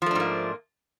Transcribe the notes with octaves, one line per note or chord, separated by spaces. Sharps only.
G#2 F3 A3 A#3 D4